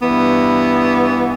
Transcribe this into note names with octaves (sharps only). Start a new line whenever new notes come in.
G2 E3 B3